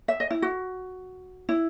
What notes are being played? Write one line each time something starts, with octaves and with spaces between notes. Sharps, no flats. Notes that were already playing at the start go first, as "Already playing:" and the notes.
E5
D#5
E4
F#4
E4